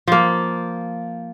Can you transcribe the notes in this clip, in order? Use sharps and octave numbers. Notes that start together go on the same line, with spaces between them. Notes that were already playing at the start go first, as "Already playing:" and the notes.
F3 A#3